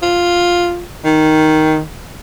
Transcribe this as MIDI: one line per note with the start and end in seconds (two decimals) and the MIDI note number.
0.02 0.84 65
1.05 1.81 51